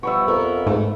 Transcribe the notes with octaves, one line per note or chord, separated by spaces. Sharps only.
F3 G3 B3 E5 B5 C#6
F2 B3 A#4
G#2 A3